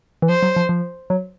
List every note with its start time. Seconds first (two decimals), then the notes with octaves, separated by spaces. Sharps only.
0.22 E3
0.29 F3 C5
0.43 F#3
0.56 F3
0.69 F3
1.10 F#3